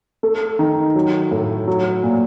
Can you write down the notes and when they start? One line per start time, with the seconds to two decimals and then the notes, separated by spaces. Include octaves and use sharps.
0.23 A3
0.59 D#3
0.95 F#3
1.31 A2
1.67 F#3
2.03 A#2